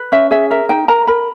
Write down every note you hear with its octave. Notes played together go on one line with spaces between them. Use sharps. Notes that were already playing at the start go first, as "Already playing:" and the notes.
Already playing: B4
C#4 E5
G#4 E5
A#4 E5
D#4 G5
A#4 A#5
A#4 B5